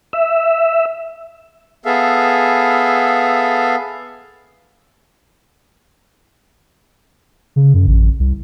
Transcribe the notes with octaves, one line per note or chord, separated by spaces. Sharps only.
E5
B3 G#4 A4 E5 F5
C#3
F#2
A1
C2